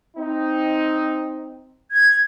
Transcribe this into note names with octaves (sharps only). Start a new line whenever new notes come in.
C4 D#4
G#6